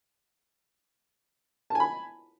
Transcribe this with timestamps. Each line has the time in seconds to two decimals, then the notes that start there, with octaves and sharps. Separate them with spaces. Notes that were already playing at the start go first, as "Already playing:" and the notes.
1.70 A5
1.75 G#5
1.80 B5